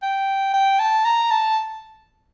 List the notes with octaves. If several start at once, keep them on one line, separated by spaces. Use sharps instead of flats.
G5
G5
A5
A#5
A5